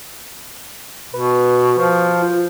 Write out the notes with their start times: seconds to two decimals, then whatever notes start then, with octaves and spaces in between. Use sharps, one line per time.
1.14 B2 B4
1.79 F3
2.22 F4